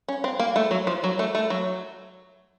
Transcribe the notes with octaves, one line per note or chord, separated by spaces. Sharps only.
C#4
C4
A#3
A3
F#3
F3
F#3
A3
A3
F#3